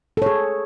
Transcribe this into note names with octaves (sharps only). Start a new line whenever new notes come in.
G#4 A4 C#5